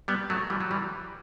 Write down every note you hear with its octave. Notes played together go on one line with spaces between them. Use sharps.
G3 B3
F#3 A3
E3 G3
F#3
E3 G3